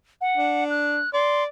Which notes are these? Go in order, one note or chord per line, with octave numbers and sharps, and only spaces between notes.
F#5
D4
F#6
D5 C6